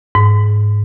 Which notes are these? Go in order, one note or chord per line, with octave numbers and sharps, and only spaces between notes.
G#2